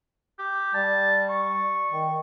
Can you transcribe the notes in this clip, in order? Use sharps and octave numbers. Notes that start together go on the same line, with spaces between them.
G4
G3 A5
C#6
D#3